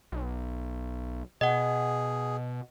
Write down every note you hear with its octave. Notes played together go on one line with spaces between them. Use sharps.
B1
B2 G#4 D#5 F#5